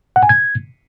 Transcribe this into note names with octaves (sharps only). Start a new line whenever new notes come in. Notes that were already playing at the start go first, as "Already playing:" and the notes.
F#5
G#5
G#6